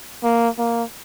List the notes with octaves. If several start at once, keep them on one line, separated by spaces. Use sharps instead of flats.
A#3
A#3